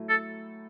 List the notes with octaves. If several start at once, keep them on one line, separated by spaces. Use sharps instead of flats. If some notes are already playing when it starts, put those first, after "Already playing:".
Already playing: A2 F#3 A3 E4
A4